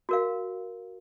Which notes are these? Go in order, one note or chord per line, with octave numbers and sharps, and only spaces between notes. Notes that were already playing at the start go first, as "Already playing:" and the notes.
F#4 A#4 F5